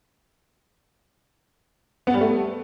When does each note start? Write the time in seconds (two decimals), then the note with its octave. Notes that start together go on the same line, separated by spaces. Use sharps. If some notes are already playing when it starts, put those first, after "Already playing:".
2.07 B3
2.14 G3
2.21 A3